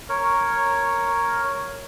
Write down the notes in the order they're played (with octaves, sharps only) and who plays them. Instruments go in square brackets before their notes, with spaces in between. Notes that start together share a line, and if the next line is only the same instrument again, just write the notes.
[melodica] A#4 C#5